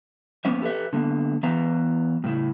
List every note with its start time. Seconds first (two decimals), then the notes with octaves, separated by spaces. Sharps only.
0.45 F3 A#3 B3 C#4 E5
0.62 G4 A4 B4 E5
0.93 D3 A#3 B3
1.43 E3 B3 E5 F5 A#5
2.24 A2 C#3 E4